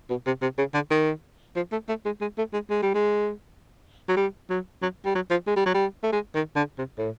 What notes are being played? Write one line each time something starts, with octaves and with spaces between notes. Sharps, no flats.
B2
C3
C3
C#3
D3
D#3
F3
A3
A3
G#3
G#3
A3
G#3
G#3
G3
G#3
F#3
G3
F#3
F#3
G3
F#3
F3
G#3
G3
F#3
G3
A3
G#3
D#3
D3
C3
A2